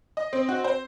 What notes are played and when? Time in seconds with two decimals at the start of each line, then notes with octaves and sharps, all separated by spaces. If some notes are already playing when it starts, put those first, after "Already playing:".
0.17 D#5
0.33 C4
0.49 F#4
0.64 C5